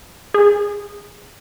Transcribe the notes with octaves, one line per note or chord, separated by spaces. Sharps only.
G#4